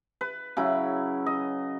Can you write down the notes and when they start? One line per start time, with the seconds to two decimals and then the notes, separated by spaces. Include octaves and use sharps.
0.21 B4
0.57 C#3 F#3 E4 B5
1.26 D#5